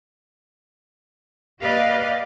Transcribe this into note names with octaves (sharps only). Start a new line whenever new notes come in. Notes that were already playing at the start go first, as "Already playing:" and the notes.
A#3 G4 B4 D5 D#5 F5